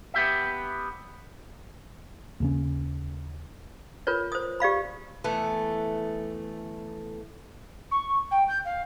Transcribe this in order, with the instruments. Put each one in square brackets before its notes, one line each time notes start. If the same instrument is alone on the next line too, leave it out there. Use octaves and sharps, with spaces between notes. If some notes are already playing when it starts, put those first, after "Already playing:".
[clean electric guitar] B3 G4 E5
[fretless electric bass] D#2 C#3 C#4
[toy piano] F4 A#4 B4 C#5
C5 D#6
G4 D5 F5 B5
[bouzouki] E3 A3 B3
[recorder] C#6
G5
G6
F5